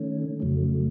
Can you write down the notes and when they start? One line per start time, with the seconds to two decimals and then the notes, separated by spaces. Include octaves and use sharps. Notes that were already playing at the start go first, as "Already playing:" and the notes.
Already playing: D#3 A3 C#4
0.40 F2 C#3 F#3 A3